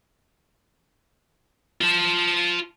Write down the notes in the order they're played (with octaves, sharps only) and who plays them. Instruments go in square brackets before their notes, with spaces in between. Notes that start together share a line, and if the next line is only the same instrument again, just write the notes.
[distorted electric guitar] F4 A5